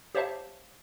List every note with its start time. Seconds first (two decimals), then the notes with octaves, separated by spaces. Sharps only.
0.15 G4 C5 C#5 E5 F5 A5